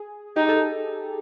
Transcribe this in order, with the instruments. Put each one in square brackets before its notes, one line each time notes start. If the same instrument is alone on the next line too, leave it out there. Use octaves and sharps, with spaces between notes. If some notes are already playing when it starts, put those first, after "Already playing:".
Already playing: [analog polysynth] G#4
[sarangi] D#4 [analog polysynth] G4
[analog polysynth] A4